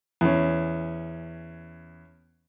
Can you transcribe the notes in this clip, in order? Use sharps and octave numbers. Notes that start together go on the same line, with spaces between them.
E2 C#4